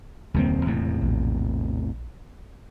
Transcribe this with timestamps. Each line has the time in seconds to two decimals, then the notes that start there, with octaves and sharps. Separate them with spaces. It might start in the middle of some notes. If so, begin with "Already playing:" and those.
0.34 E1 C#2 D#3 G3 A#3 C4
0.65 E2 A2 C3
1.02 A#1